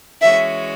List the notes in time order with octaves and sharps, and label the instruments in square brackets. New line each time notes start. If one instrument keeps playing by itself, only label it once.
[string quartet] E3 G#3 C#4 F#4 [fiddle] E5